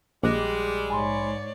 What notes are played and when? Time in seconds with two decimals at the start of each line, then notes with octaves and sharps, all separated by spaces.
0.23 A#1 G3 G#3 D6 F#6 A#6
0.90 G#2 C#5 D5 G#5 B5 C6